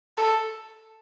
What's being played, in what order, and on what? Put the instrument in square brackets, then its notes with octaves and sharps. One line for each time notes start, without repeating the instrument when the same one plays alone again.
[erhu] A4